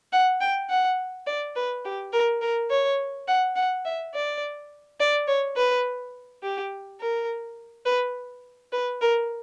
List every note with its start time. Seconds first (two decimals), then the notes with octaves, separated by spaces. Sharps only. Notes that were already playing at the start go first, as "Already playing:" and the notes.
0.13 F#5
0.41 G5
0.70 F#5
1.27 D5
1.56 B4
1.85 G4
2.13 A#4
2.41 A#4
2.71 C#5
3.27 F#5
3.56 F#5
3.85 E5
4.14 D5
5.00 D5
5.28 C#5
5.57 B4
6.43 G4
7.00 A#4
7.86 B4
8.72 B4
9.01 A#4